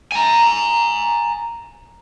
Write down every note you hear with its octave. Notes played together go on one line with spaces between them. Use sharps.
G#5 A#5